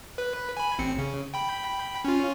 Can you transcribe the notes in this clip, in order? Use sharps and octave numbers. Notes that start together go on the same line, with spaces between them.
B4
G#5 B5
A1 C4 C#7
C#3
G5 B5
C#4 F4